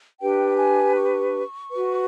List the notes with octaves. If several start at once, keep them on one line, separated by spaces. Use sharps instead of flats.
D4 G4 B4 G5
G#5
C#6
F#4 B4